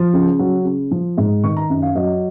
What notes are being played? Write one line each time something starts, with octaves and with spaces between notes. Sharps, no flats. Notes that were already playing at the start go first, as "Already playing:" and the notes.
Already playing: F3
C#3
F#3
C#3
F3
G#2
D#3 C#6
A#5
F#2
F5
F#3 D#5